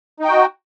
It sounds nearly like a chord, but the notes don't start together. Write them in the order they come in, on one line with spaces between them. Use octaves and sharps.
D#4 G5 F#4